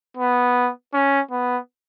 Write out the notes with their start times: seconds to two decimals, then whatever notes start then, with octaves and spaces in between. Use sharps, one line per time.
0.17 B3
0.94 C#4
1.31 B3